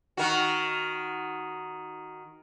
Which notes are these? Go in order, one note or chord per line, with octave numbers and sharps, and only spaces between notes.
D#3 F#4